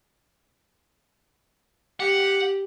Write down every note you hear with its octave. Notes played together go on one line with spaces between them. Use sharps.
G4 F#5